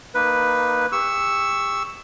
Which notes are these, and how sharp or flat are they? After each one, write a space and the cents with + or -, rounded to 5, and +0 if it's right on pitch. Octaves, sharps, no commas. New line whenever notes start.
A#3 +10 D#4 -10 B4 +0
G4 +35 C#6 +0 E6 +0